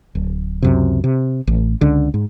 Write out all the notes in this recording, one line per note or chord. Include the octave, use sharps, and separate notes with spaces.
D1
C#2 F#2 C3
C3
A1
C#2 D3
G#2